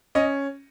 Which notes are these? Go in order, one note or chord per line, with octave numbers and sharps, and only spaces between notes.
C#4 D#5